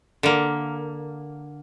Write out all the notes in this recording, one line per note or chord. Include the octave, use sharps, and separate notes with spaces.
D3 A#3